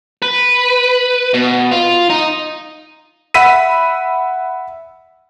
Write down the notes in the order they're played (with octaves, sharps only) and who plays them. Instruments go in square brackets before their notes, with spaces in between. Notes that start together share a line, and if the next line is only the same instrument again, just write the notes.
[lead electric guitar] B4
B2
F4
D#4
[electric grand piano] E5 F#5 B5 E6 B6 D#7